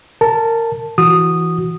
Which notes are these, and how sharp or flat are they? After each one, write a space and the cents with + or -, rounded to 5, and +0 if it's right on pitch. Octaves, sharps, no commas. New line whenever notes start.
A#4 -20 A5 +0
E3 +10 F#4 +0 D#6 -10